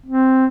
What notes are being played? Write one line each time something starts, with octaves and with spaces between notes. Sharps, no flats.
C4